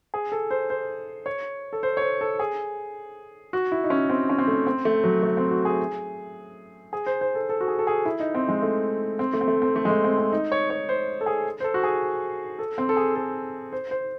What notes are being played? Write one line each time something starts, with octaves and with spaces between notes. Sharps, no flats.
G#4
A4
C5
C5
C#5
A4
C5
C#5
C5
A4
G#4
F#4
E4
D#4
C#4
C4
C#4
C4
A3
C4
A3
F#3
A3
C4
F#4
G#4
G#4
C5
C5
A4
A4
F#4
G#4
A4
G#4
E4
D#4
C4
G#3
A3
C4
A3
C4
A3
C4
A3
G#3
A3
C4
C4
D#4
C#5
C#5
C5
A4
G#4
C5
A4
F#4
G#4
A4
C4
A4
G#4
A4
C5
C5